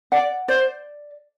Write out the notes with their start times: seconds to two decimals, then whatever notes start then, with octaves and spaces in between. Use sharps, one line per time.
0.12 D5 F#5
0.48 C5 D5